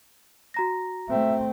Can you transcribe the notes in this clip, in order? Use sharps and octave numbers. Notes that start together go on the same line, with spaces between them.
F#4 A#5 A#6
A3 C4 E5